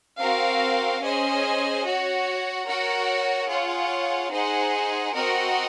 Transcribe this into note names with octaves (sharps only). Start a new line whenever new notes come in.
C4 F#4 A#4 F5
C#4 G#4 C5 D#5 G#5
F#4 C#5 F#5
F#4 A#4 C#5 F#5
F4 G#4 C#5 F#5
D#4 G#4 C5 F#5
C4 F#4 A#4 D#5 F#5